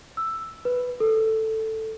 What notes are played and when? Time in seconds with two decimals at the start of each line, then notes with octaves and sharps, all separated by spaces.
0.17 E6
0.65 B4
1.00 A4